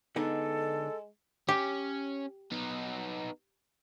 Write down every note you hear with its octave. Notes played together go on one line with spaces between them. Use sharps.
D3 G#3 B3 D#4 A4
C#4 G4
B3 D#4